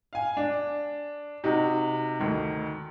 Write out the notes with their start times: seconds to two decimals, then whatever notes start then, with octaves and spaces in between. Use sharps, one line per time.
0.13 F5 G#5
0.37 D4
1.44 C3 D#4 F#4
2.20 D2 D#3